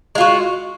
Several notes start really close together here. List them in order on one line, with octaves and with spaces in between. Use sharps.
G#3 F4 F#4